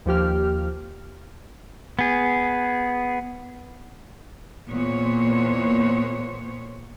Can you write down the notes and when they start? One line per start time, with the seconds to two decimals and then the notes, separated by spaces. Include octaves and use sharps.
0.06 D#2 F3 G4 F6
1.99 B3 G#4
4.70 E2 A#2 A#3 B3 C5 C#5